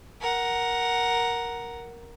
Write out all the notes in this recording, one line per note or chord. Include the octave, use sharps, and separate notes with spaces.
A#4 F#5